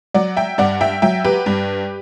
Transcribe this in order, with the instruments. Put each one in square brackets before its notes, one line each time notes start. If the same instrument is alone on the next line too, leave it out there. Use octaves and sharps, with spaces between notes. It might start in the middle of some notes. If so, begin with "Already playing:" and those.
[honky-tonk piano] F#3 D5 F#5
E5 G5
G2 D5 F#5
E5 G5
F#3 E5 G5
G4 B4
G2